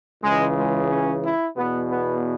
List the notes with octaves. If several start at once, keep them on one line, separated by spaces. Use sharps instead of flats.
C#2 C#3 E3 G#3
G#3
C#4
E4
E2 B2 B3
B3